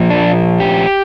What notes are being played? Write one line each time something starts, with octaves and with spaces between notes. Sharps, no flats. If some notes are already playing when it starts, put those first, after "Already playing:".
Already playing: A#2 F3
D4
G4